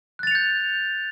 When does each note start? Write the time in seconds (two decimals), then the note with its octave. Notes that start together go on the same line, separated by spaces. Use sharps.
0.19 F#6
0.23 A6
0.27 F7
0.31 C#7
0.35 G6